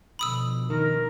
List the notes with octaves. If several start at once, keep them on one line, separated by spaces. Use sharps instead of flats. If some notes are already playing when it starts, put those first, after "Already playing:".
B2 D3 F3 B5 D#6 E6
D#3 A#4